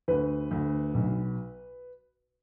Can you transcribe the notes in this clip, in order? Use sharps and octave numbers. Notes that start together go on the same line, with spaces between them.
D2 B4
D2
B1